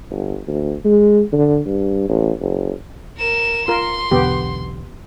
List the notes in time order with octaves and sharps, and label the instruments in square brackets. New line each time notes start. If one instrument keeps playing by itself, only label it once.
[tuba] G1
D2
G#3
D3
G2
A1
F#1
[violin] A#4 E7
[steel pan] F4 A#4 [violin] C6
[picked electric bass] B1 E2 D3 [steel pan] B3 G4